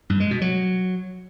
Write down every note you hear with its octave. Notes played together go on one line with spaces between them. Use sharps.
G2
G#3
B2
F#3